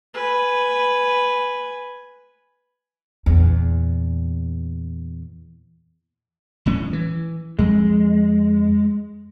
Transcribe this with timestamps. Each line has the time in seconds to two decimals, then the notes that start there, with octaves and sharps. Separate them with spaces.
0.14 B4 G#5
3.26 E2 A#2
6.66 D#1 A2 C#4
6.93 E3
7.59 F2 G#3